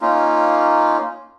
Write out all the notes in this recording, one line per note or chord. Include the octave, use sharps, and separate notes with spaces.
A#3 C#4 D#4 F4